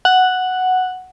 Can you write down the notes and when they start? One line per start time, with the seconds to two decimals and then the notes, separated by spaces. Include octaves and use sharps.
0.05 F#5